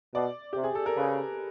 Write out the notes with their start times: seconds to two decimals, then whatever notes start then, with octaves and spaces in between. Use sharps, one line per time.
0.15 B2 D5
0.53 C3 G4
0.64 G#4
0.75 A4
0.86 A#4
0.97 C#3 B4